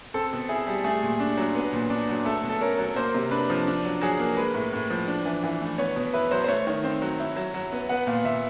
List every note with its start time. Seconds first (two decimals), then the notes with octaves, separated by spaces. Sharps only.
0.14 C4 A4
0.33 B2
0.49 E4 G#4
0.67 G3
0.84 A3 G#4
1.03 A#2
1.20 D4
1.38 F#3
1.55 B3
1.73 A#2
1.90 D4
2.09 F#3
2.25 A3 A4
2.43 B2
2.49 A4
2.61 C#4 A#4
2.78 F#3
2.96 A#3 C5
3.15 C3
3.31 D4 B4
3.50 F3
3.67 D4
3.85 F#3
4.01 F#3 G#4
4.19 A#3
4.37 G#3 B4
4.54 A2
4.73 A2
4.90 F3
5.08 D4
5.25 E3
5.44 E3
5.61 A3
5.78 B3 C#5
5.96 B2
6.13 E4 B4
6.31 F#3 C5
6.44 C5
6.48 A3 C#5
6.67 D#3
6.84 C4
7.02 F#3
7.20 E4
7.36 F#3
7.54 F#3
7.72 B3
7.89 B3 F#5
8.07 A#2 F5
8.25 A#2 E5